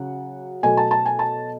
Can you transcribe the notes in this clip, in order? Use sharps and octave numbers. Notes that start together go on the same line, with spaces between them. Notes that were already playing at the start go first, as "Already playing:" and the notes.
Already playing: C#3 F#3 F#5
B2 F#3 A3 G#5
A5
A5
G#5
A5